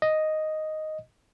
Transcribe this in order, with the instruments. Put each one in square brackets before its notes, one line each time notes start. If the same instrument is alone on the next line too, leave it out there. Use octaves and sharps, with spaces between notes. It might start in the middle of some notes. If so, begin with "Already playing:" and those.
[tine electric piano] D#5